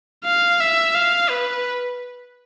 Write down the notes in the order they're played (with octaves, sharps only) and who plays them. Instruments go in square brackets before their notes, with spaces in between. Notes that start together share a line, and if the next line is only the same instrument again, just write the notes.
[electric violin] F5
E5
F5
B4